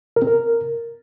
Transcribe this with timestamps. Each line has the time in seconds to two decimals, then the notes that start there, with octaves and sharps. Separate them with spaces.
0.16 A#4
0.22 C4
0.27 A#4